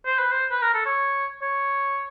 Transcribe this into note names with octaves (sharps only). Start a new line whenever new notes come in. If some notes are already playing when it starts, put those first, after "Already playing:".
C5
B4
C5
B4
A#4
A4
C#5
C#5